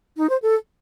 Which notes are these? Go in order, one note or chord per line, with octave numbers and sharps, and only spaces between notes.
D#4
C5
A4